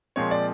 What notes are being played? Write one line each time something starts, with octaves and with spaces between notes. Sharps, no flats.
A#2 F3 G#3 C4 C#5
D5